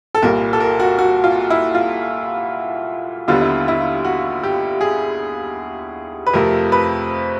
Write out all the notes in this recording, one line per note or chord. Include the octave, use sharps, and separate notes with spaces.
A4
C2 A#2 G3 A#4
A4
A#4
F#4
F#4
F4
E4
F4
D#2 D3 G3 B3 F4
E4
E4
F#4
G4
G#4
B4
F2 C3 F3 A3 A#4
B4